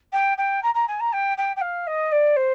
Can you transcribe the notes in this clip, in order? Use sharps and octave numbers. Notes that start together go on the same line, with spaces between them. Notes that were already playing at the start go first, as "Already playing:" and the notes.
G5
G5
A#5
A#5
G#5
A#5
G5
G5
G5
F5
D#5
D5
C5